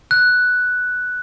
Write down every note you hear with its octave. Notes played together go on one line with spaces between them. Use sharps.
F#6